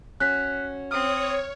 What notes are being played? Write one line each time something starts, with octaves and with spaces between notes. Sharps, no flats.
C#4 F#4 F#6 B6
C4 C#5 D#6 F6